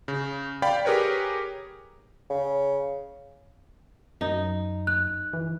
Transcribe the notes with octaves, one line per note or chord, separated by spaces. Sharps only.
C#3
D5 F5 G5 B5
G4 G#4 A#4 B4 C#5
C#3
F#2 D#4
F#6
E3